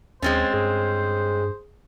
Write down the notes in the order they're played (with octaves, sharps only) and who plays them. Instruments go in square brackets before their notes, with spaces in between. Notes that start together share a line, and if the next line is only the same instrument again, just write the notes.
[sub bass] D#2 [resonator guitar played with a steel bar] G#3 C4 C#4 [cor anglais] C5 [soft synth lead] A6
[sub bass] G2 [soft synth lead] G#4